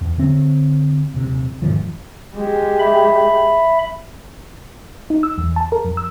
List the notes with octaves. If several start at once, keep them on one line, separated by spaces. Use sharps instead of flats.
E2
D3 C4
D#1 C3
F2 G#2 D#3 F3
G#3 G4
E5 B5
D#4
E6
E2
A5
A#4
F2
E6